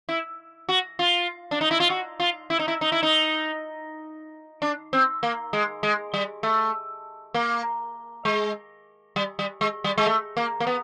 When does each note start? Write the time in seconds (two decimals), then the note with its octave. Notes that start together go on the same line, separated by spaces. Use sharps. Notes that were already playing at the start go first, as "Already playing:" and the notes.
0.09 E4
0.69 F#4
0.99 F4
1.51 D4
1.61 D#4
1.71 E4
1.80 F4
1.90 F#4
2.20 F4
2.50 E4
2.59 D#4
2.68 E4
2.81 D#4
2.92 E4
3.03 D#4
4.62 D4
4.93 C4
5.23 A#3
5.53 G#3
5.83 G#3
6.14 G3
6.43 A3
7.34 A#3
8.25 G#3
9.16 G3
9.39 G3
9.61 G#3
9.84 G3
9.98 G#3
10.06 A3
10.37 A#3
10.60 A#3
10.67 B3